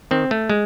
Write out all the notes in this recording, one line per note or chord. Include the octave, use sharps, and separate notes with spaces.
D#3 C4
A3
G#3